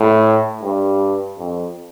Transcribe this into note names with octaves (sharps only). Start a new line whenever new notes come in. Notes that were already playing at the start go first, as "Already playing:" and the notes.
Already playing: A2
G2
F2